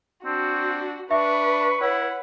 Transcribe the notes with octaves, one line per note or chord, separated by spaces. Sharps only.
C4 D4 F#4
D4 B4 E5 C#6
E4 C#5 F#5